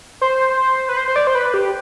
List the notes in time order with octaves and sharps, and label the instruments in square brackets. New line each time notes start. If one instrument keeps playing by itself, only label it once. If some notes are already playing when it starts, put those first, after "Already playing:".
[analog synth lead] C5
B4
C5
C5
D5
C5
B4
G4